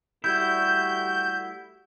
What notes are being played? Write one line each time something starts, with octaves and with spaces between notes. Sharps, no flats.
G3 A3 E4 F#4 G6